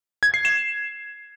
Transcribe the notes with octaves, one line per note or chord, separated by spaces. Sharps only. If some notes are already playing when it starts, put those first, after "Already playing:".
G#6
C7
E7